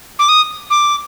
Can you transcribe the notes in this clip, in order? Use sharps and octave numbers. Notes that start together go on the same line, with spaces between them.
D6
D#6
D6